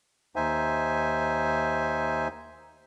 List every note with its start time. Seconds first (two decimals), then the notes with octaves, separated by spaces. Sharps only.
0.36 D#2 D#4 C5 E5 G#5